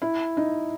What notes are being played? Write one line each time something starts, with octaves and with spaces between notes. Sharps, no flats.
E4
D#4